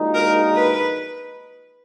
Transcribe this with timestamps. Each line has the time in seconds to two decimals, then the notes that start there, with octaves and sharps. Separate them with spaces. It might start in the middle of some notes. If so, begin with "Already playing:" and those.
Already playing: A#1 A#2 G#3 D#4 F#4
0.14 A#4
0.55 B4